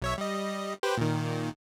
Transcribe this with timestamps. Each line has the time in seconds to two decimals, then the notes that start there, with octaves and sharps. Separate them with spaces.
0.02 B1 C#5 E5
0.18 G3 D#5
0.83 G4 B4 C5
0.97 A#2 D#3